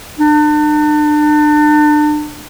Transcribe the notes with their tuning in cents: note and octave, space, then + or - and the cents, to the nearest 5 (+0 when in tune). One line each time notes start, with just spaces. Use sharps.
D4 +35